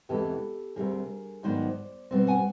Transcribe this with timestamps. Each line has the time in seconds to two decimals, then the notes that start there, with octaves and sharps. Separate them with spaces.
0.09 E2 C3 E3 G#3 G4 A4
0.76 D2 C3 D#3 G3 G#4 A#4
1.43 G#2 D#3 F#3 B3 C5 D5
2.11 B2 G3 C4
2.27 F#5 G#5